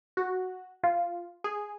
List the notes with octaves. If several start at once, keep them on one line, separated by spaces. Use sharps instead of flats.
F#4
F4
G#4